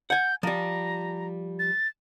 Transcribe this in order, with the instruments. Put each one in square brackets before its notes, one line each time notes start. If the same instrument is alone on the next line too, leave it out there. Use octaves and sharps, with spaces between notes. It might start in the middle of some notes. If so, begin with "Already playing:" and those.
[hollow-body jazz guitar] F#5 G#5 [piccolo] G6
[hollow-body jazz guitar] F3 G3 [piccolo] A#5
[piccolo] A6